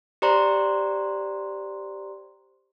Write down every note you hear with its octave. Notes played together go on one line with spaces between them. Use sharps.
G4 C5 D5 A#5 C6